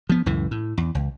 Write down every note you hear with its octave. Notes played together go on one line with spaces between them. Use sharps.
F3 B3
C#2 F#2 A2 E3
A2
E2
C#2